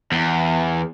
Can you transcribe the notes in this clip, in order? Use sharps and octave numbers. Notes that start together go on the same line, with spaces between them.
E2